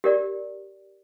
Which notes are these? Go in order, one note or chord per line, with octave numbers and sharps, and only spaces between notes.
G4 A#4 D5